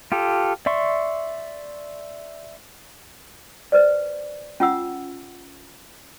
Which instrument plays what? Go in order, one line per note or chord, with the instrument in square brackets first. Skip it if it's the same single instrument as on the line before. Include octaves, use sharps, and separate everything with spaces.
[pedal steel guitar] F4 G4 A4
D5 E5 C6 C#6
[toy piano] B4 C5 D5
C#4 F4 F#5 E6